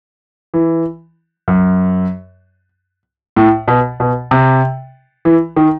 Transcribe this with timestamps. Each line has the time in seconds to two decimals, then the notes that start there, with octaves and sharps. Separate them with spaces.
0.54 E3
1.48 F#2
3.36 A2
3.68 B2
4.00 B2
4.31 C3
5.25 E3
5.56 D#3